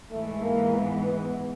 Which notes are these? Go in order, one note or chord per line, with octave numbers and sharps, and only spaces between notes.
G#2 E3 G#3 A3
A#3
B3
B3